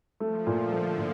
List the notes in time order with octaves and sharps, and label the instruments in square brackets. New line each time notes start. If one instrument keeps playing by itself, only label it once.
[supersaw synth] F3 [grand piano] A3
[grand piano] A#2
[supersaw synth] D3
[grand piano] A3
A#2